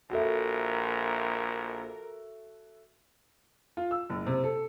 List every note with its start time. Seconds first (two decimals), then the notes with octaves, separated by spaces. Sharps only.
0.10 A#1 F#4 A4 A#4 E5
3.77 F4
3.91 E6
4.10 F#1
4.27 C3
4.44 A4